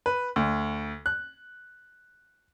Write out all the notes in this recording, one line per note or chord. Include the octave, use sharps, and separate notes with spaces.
B4
D2
F#6